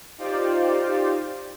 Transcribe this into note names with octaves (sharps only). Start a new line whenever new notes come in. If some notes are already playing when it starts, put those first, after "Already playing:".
D#4 F4 G4 C5 D5